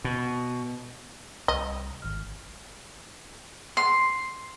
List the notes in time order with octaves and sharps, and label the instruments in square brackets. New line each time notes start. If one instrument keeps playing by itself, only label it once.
[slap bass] B2
[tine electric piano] C2 [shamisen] D#5
[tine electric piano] G#1 F6
[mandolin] C6